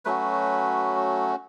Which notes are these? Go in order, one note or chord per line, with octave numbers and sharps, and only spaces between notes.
F#3 A3 C#4 F#4 B4